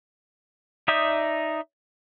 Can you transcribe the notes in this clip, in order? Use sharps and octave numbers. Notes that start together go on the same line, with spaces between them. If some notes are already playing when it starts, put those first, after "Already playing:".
D#4 D5 E5 D#6 G6